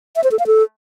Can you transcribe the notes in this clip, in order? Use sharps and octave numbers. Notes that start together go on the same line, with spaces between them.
E5
C5
A4
F5
A4